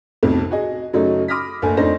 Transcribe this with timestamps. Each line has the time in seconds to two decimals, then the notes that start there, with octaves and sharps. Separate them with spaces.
0.23 B1 F2 A2 C3
0.51 F#4 G#4 D#5
0.93 F#2 C#3 F#3 A3 D#4
1.28 B5 D6 D#6 F6 A#6 B6
1.62 F#1 D2 A3 G#5
1.77 F2 A3 D4 D#4 C5 A#6